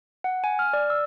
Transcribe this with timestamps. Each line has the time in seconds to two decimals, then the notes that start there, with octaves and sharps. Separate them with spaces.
0.24 F#5
0.44 G#5
0.59 F6
0.73 D5
0.90 E6